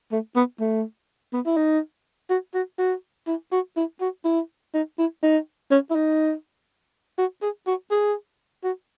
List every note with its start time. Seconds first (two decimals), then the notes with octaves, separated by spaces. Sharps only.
0.12 A3
0.36 B3
0.60 A3
1.33 B3
1.46 E4
1.57 D#4
2.30 F#4
2.55 F#4
2.79 F#4
3.27 E4
3.52 F#4
3.77 E4
4.01 F#4
4.25 E4
4.74 D#4
4.98 E4
5.23 D#4
5.71 C#4
5.91 E4
5.95 D#4
7.18 F#4
7.42 G#4
7.67 F#4
7.91 G#4
8.64 F#4